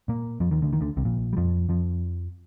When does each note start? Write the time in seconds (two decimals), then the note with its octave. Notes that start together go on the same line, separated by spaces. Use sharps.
0.08 A#2 A#3
0.40 F2 F3
0.51 D#2 D#3
0.62 D2 D3
0.73 D#2 D#3
0.81 D2 D3
0.97 C2 C3
1.05 A#1 A#2
1.33 G3
1.37 F2 F3
1.69 F2 F3